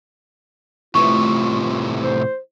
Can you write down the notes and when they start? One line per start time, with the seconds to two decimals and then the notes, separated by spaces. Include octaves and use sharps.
0.95 A2 C3 E3 A3 E4 F4 B4 C#6
2.03 C5